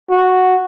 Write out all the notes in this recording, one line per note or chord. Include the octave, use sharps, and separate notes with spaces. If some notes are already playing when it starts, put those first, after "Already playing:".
F#4